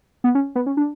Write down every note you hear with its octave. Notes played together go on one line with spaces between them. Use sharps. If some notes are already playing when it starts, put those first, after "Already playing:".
B3
C#4
B3
C#4
D4